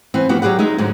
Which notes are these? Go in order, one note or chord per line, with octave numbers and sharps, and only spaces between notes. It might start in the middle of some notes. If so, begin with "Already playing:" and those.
E3 B3 C4
A2 F3 B3 F#4 G4
F#3 G4 G#4 D5 F#5
G#3 D#4 E5
G#2 D3 F#3